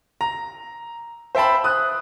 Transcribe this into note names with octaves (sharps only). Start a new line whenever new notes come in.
A#5
C5 E5 G5 A5 B5
D#6 F#6